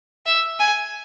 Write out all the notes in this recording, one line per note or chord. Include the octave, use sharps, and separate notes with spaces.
E5
G#5